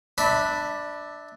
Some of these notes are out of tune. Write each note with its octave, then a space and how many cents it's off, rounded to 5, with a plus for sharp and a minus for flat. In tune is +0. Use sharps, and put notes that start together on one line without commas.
D4 +10 E5 -20 B5 +0